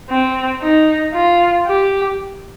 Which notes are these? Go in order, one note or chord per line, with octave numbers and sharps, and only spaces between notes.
C4
D#4
F4
G4